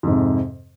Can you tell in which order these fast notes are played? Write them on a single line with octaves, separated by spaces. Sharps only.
F2 G#2 C3